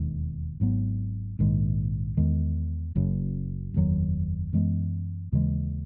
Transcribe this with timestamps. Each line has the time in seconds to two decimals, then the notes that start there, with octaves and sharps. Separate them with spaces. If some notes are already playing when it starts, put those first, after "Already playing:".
Already playing: E1 D#2 D#3 G#3
0.60 G#1 G#2 F#3 B3
1.39 A#1 G#2 D#3 G#3
2.17 E2 D#3 G#3
2.96 F#1 F#2 C#3
3.74 F#1 E2 D#3 F#3
4.53 F#2 E3 G#3 B3
5.32 D#2 C#3 E3 G#3